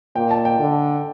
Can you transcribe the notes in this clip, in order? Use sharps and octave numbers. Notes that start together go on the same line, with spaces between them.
A#2 G5
A5
G5
D3